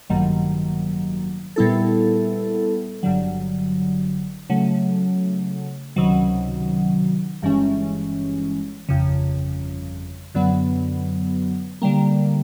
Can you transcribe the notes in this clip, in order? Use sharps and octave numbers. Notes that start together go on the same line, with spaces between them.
A1 G2 D#3 F#3 A#3
A#2 G3 B3 E4 A4
G1 G2 D3 F#3
C#3 F#3 A3
C#2 C3 D#3 F#3
G1 G2 E3 G#3 C#4
G1 F2 C#3
F#2 D3 F#3 B3
D3 G3 A#3